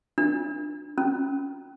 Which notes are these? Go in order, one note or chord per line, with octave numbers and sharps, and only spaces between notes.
D4
C#4